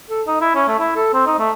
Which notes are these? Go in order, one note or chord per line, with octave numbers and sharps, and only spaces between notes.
A4
D#4
E4
C#4
A3
E4
A4
C4
D#4
A3